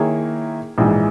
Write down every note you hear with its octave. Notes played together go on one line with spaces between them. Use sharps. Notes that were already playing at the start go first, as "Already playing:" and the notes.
Already playing: D#3 A#3 E4 G#4 C#5
A#1 G#2 E3 G#3